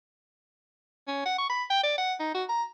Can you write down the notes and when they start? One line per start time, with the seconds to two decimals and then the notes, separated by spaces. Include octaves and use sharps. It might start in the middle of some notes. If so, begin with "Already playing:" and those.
1.08 C#4
1.26 F#5
1.38 C#6
1.50 B5
1.70 G5
1.84 D5
1.98 F#5
2.20 D#4
2.35 F#4
2.49 A#5